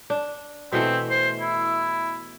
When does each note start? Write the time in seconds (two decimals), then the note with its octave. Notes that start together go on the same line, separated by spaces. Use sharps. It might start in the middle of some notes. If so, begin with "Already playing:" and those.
0.10 D4
0.72 B2 E3 A3 C4
1.10 C5
1.40 E4